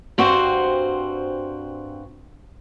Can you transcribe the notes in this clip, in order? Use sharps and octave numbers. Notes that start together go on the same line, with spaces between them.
G2 C4 F#4 C5